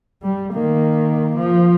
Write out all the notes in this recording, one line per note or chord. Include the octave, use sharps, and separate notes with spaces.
G3
D#3 A#3
F3